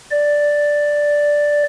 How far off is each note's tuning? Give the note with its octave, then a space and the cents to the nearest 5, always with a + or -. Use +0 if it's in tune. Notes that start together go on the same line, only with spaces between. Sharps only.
D5 +0